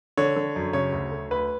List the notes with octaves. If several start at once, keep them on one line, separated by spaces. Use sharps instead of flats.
D3 C#5
D3
F#2
C#3 C#5
D2
A3
D2 B4